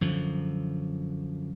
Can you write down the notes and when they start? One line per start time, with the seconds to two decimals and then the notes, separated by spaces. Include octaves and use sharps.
0.01 F#2 D3 F3